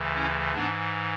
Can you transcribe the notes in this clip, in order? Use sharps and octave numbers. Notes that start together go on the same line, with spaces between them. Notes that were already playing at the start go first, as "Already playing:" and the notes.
Already playing: D2 C#3 E3
C#4 E4
G#2 E3 B3 D4